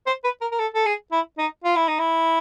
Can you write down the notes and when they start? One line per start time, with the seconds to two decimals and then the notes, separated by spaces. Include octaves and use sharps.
0.07 C5
0.24 B4
0.41 A#4
0.52 A#4
0.59 A4
0.74 A4
0.86 G#4
1.12 E4
1.38 D#4
1.64 F4
1.76 E4
1.88 D#4
1.99 E4